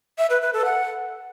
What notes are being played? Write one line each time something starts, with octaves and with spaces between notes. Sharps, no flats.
E5
B4
B4
A4
F#5